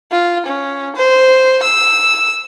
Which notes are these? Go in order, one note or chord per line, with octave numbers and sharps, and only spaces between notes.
F4
C#4
C5
E6